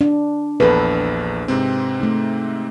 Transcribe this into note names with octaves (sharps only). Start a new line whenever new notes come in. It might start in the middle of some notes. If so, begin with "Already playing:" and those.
D4
A#1 E2 A4 B4
G#2 C3 C4
A3 D#4